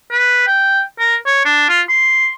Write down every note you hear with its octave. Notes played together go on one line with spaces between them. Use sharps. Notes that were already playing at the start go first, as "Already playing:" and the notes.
B4
G5
A#4
C#5
D4
F4
C6